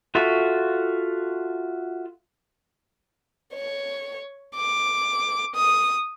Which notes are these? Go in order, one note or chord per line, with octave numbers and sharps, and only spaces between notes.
F4 F#4 A4 E5 C#6
C#5
D6
D#6